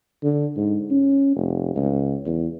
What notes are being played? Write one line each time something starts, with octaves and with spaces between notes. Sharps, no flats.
D3
G#2
C#4
F1
C#2
E2